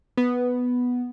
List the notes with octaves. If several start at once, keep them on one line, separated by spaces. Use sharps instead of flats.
B3